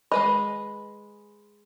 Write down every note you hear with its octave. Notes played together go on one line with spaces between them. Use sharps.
G#3 B4 D#5 B5